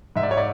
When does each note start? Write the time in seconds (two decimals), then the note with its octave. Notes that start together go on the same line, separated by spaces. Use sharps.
0.16 G#2 E5
0.23 D5
0.31 C#5
0.37 D5